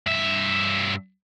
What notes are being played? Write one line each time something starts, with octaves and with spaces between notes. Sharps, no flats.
G2 E5